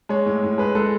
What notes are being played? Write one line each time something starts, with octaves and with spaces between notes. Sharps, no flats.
G#3 C#5
A2
A2
G#3 B4
G#3 A4